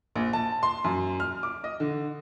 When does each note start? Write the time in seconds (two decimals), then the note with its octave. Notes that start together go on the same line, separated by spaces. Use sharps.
0.16 A#1
0.33 A5
0.63 C6
0.84 F#2
1.20 F6
1.43 D6
1.64 D#5
1.80 D3